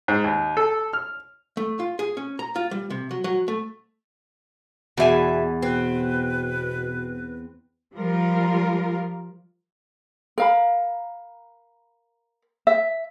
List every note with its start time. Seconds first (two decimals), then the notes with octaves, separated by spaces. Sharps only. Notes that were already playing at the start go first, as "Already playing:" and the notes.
0.08 G#2
0.24 D#2
0.57 A4
0.93 F6
1.57 A3
1.80 F4
1.99 G#4
2.17 C#4
2.39 A#5
2.56 F4
2.71 G3
2.90 C3
3.11 F#3
3.24 F#3
3.48 A3
4.97 E2 B2 D5 E5 G#5
5.62 B2 C4 B4
7.94 F3 G3 F4 A#4
10.38 A#4 F5 B5
12.67 E5